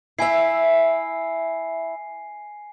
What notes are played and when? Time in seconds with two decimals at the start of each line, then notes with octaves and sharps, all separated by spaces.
0.19 E4 E5 G#5 C7